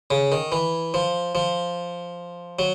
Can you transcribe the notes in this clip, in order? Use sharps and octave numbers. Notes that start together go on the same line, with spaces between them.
C#3
D#3
E3
F3
F3
F#3